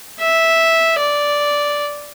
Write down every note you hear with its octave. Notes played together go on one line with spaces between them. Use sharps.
E5
D5